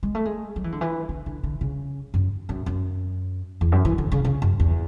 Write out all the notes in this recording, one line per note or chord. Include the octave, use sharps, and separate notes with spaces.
G#3
A3
G#3
F#3
E3
D3
E3
D3
D3
D3
C#3
F#2
F#2
F#2
E2
F#2
E3
D3
C#3
C#3
F#2
E2